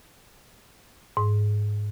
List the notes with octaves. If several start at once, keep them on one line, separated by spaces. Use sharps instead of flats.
G#2